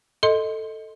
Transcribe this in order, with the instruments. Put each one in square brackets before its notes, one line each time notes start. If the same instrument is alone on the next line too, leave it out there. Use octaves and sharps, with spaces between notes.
[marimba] A4 D#5 C6